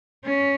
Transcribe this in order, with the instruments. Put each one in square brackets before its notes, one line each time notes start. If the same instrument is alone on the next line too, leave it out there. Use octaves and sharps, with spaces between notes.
[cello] C#4